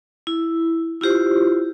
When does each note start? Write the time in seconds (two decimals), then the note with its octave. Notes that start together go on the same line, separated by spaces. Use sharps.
0.27 E4
1.01 E4 F4 G4 C5